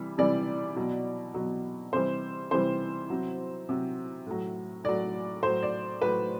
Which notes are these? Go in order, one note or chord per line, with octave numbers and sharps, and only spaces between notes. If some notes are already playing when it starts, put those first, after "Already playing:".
Already playing: C3 E3 G3
C3 E3 G3 D5
B2 F#3
B2 F#3
C3 E3 G3 C5
C3 E3 G3 C5
C3 F#3
C3 F#3
A2 F#3
A2 F#3 D5
A2 F#3 C5
D5
A2 F#3 B4